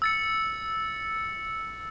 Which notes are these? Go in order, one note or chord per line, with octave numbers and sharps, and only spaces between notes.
E6 A6 C#7